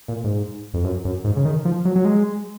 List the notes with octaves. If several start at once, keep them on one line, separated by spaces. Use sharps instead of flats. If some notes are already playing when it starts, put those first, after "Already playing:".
A#2
G#2
F2
F#2
F#2
G#2
C#3
D#3
F3
F#3
F#3
G#3